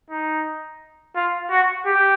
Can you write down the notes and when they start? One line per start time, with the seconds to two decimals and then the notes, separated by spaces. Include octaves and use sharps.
0.10 D#4
1.16 F4
1.51 F#4
1.86 G4